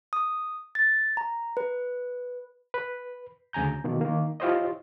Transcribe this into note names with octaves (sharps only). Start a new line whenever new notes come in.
D#6
A6
A#5
B4
B4
D2 C#3 G#5 A#5 G6
B2 D#3 A#3
D#3 A#3
E4 F4 G4 C5 C#5 D#5